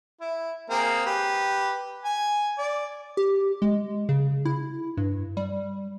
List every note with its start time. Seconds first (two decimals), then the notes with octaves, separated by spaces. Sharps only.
0.21 E4
0.70 A#3 C4 G#4
1.06 G4 B4
2.05 G#5
2.58 D5
3.17 G4
3.62 G#3
4.09 C#3
4.45 E4
4.97 G2
5.37 G3